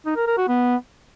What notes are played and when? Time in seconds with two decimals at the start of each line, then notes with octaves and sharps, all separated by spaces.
0.06 D#4
0.16 A#4
0.27 A#4
0.38 F#4
0.48 B3